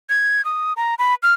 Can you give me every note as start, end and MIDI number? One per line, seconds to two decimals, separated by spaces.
0.09 0.44 92
0.45 0.73 87
0.77 0.95 82
0.99 1.15 83
1.23 1.34 89